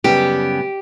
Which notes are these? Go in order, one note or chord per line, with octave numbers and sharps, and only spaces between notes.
F#2 C#3 G3 B3 G4